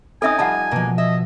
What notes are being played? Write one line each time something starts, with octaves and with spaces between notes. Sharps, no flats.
C4 C#4 D#4 A4 E5 G#5 D#6
F3 G3 D#4 F#5 A5
B2 F3 G#3 A#3
D#5 E5